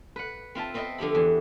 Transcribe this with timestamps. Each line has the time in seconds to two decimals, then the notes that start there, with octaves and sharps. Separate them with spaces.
0.16 B4 F#5
0.55 C4 F4 E5 A5
0.74 B3 C4 B4 D#5 E5 C6
0.98 D3 F3 G4 B5
1.15 E2